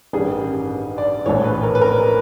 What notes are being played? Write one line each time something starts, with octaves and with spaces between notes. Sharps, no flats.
A1 G2 D#3 G3 G#4
D5
A#1 A2 E3 C#5
B4
A#4
B4
A#4